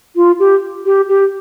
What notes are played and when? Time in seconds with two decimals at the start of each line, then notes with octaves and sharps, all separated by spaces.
0.16 F4
0.39 G4
0.85 G4
1.08 G4